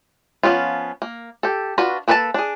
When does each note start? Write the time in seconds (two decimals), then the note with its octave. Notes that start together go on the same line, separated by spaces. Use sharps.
0.43 F3 F#3 B3 C#4 F4
1.02 A#3
1.43 G4 A4
1.78 D4 F4 F#4 B4
2.08 A#3 A4 B4 D5 A5
2.34 D4 G#4